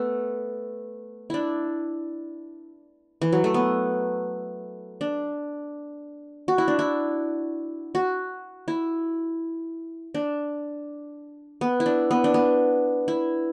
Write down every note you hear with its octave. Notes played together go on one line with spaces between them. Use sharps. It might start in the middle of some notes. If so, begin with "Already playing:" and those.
Already playing: A3 B3
D4 E4
E3
F#3
A3
B3
D4
F#4
E4
D4
E4
F#4
E4
D4
B3
E4
D4
B3
D4
B3
E4